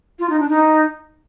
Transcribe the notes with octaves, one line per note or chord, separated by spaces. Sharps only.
F4
D#4
D4
D#4